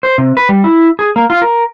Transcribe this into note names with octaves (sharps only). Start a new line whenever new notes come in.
C5
C3
B4
G3
E4
G#4
A#3
F4
A#4